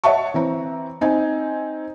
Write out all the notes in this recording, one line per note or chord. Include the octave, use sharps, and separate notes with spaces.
C#5 D#5 E5 F#5 A5 C#6
E3 C4 A#5
C4 D#4 G#5